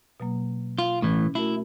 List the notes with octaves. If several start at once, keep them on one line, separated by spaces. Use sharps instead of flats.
B2 F#3 A#3
F4
A2 E3 C#4
A3 E4 F#4 A#4